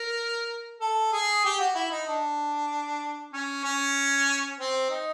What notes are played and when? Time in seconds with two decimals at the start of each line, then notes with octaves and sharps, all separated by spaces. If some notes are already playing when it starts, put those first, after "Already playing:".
Already playing: A#4
0.81 A4
1.13 G#4
1.45 G4
1.60 F#4
1.75 E4
1.91 D#4
2.07 D4
3.33 C#4
3.64 C#4
4.59 C4
4.90 D#4